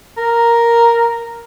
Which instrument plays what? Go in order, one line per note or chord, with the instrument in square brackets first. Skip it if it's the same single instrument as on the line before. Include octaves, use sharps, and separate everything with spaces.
[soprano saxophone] A#4